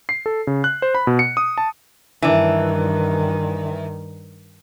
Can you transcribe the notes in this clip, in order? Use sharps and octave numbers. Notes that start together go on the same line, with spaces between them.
C7
A4
C#3
F#6
C5
B5
B2
C#7
D#6
A5
G2 D#3 E3 D4